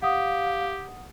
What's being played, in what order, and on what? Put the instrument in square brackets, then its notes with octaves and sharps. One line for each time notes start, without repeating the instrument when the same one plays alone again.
[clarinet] G4 [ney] F5 [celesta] F#5 D#6